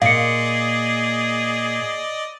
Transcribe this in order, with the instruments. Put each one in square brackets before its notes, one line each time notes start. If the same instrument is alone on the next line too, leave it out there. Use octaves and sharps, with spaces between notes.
[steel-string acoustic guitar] A#2 [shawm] G#4 [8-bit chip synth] D5 D#5 [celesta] F5 C#7